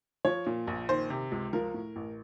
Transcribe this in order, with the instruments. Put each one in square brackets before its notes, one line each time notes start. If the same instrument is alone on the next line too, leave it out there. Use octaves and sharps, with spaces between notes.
[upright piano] F3 C#5
A#2
A#1
D#3 C5
C3
C#2
F3 A#4
A2
A1